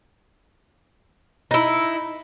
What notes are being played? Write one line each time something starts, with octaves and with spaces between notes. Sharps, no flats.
D#4 E4